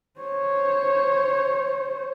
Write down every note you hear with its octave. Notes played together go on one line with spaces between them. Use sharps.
C5 C#5